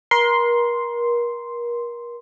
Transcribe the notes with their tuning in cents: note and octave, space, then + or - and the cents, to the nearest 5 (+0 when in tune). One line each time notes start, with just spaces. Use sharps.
A#4 +35 C6 +0